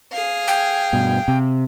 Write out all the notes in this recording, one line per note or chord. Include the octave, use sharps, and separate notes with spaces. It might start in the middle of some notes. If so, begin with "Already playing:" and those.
G#4 F5
G5
G2 B2
C3